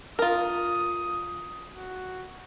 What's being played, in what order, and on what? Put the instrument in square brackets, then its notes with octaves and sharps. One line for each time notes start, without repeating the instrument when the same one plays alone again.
[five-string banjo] F4 A#4 [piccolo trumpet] D#6
[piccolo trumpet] F#4